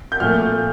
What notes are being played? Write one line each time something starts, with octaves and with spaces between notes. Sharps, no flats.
G6
A#2 F3 A3 F6